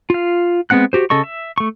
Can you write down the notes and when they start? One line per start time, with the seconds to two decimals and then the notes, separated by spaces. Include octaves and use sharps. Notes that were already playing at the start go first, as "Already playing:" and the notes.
0.10 F4 F5
0.70 G#3 B3 C4 F#5 F#6
0.93 F#4 G4 C5
1.10 C#3 A4 D#5 C#6
1.24 E5
1.58 A3 C#6